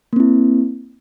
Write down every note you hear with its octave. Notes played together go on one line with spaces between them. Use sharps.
A#3 C4 E4